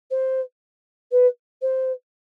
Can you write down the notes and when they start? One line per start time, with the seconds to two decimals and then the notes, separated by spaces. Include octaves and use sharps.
0.11 C5
1.11 B4
1.62 C5